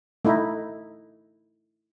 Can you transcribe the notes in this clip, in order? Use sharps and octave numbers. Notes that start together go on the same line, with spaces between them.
A3 D#4 E4